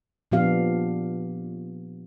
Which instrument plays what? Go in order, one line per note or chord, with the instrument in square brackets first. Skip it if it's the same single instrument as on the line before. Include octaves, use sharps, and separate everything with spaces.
[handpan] A#2 F3 B3 D4 G4 F5